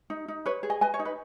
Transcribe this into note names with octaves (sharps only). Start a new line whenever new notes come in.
D#4
D#4
B4 C#5
G#4
D#5 G#5
B4 D#5 G#5
C#5
D#4
B4